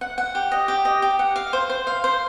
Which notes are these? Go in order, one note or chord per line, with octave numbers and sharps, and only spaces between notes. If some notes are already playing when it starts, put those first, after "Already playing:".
F#5
F#5
G4
D#5
G4
D#5
G4
F#5
F5
C5
C5
F5
C5